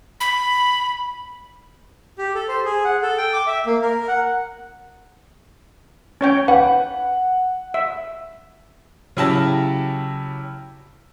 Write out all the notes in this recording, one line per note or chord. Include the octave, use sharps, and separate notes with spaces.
B5
G4
A4
C5
G#4
F#5
A4
G5
D6
E5
A#3
A#4
F#5
C#4 C#5 G5
B4 F#5
E5
C#3 F#3 E4 G4 A5 A#6